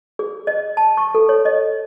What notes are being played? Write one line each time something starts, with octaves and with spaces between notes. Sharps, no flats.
G#4
D#5
A5
C#6
A4
C#5
D#5